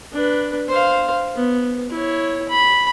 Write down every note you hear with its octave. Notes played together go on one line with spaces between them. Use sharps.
D4 B4
C5 F5
B3
E4 C#5
B5